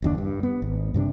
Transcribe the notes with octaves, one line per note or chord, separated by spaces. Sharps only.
F#1 D#2 D4
G2
B3
G#1
G2 C3 C#4 D4